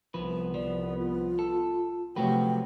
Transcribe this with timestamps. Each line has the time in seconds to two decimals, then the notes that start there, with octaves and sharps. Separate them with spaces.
0.14 C2 F3 B3 B4
0.54 F3 D5
0.99 F4
1.39 A4
2.16 C3 F3 F#3 A3 F#4 B4 G5